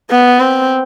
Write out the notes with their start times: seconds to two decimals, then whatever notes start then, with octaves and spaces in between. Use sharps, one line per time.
0.10 B3
0.40 C4